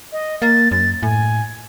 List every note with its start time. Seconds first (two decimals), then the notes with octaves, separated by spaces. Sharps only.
0.13 D#5
0.42 A#3 A6
0.71 F#2 A6
1.03 A2 G#5